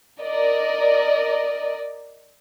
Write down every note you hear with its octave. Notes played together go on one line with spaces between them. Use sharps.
A#4 D5 D#5